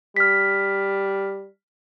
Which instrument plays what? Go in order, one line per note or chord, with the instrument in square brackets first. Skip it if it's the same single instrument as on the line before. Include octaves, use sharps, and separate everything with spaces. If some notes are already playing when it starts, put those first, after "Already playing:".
[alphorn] G3 [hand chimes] F6 B6